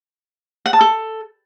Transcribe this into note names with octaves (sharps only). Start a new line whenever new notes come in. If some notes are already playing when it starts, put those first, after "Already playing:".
F#5
A5
A4